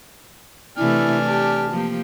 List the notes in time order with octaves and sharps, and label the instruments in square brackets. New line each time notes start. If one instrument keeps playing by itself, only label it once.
[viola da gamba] C3 E3 A3 [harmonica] D4 G#5 F6 [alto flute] E4
[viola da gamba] G4 [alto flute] A5
[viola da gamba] F3 A#3 G4